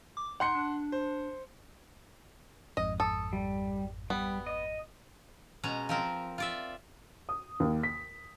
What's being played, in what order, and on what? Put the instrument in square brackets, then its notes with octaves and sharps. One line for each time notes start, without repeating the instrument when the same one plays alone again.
[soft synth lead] D6
[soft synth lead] D#4 [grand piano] F#5 C6 C#7
[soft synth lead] D4
[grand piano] C5
[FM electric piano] G#1 F2 G#2 [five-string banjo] D#5
[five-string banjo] A4 [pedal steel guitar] D#6
[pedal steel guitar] G3
[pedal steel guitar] G3 [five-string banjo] B3
[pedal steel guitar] D#5
[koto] B2 G#3 C#4 A#5
F3 C4 A#4
F4 D5 E5
[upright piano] D#6
D#2
B6